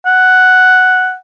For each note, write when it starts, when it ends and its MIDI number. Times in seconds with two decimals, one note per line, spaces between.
0.06 1.15 78